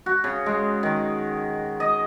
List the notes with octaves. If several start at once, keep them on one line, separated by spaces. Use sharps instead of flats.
F#4
C#3
G#3
D#3
D#5